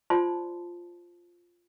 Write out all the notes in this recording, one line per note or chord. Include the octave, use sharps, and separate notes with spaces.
F4 C5 D5 A5 C6